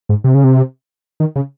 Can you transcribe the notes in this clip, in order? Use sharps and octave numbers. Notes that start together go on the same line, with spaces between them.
G#2
C3
C#3
C3
D#3
C#3